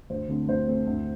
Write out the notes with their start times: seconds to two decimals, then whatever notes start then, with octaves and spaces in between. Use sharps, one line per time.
0.10 D2 C5
0.28 D3 A3 C4
0.48 D2 C5
0.67 D3 A3 C4
0.87 D2